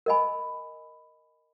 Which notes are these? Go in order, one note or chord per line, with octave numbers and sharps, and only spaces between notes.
A#4 D#5 G#5 B5